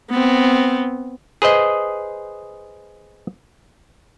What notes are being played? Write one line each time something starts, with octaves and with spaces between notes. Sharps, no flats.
B3 C4
G#4 B4 C5 D#5